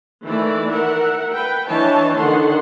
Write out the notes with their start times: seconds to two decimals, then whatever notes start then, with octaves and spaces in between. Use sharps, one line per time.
0.25 D#3 E3 A3 E4 D5
0.69 A#4 E5 F#5
1.31 B4 G5
1.67 E3 D4 C#5 D#5 A5
2.17 D3 D#3 F#5 C6